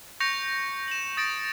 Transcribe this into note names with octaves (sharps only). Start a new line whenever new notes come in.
C#6 G6 A#6 C#7 F7
E7 F#7
D#6 A6 A#6 D7